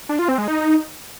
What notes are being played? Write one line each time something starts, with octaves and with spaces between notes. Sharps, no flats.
D4
F4
C4
G#3
D#4